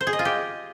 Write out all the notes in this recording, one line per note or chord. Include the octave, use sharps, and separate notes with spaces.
C5
G#4
D#5
F4
G4